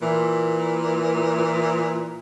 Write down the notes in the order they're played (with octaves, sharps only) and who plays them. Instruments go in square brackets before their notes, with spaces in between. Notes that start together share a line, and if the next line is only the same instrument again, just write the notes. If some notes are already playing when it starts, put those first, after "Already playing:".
[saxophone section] A#2 E3